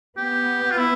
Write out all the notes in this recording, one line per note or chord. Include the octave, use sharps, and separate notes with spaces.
B3 G4
F4
E4